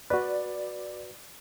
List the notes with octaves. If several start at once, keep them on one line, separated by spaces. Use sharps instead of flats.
F#4 B4 D5